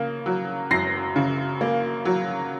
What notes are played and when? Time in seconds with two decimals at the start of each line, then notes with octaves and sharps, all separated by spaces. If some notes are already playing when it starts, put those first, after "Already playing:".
Already playing: C#3 A#3
0.26 F#3
0.71 F#2 A#6 C7
1.16 C#3
1.61 A#3
2.05 F#3